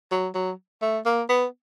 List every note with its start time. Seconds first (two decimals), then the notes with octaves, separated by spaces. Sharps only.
0.11 F#3
0.35 F#3
0.82 A3
1.06 A#3
1.29 B3